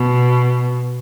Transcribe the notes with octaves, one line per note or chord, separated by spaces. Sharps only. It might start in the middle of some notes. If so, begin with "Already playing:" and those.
Already playing: B2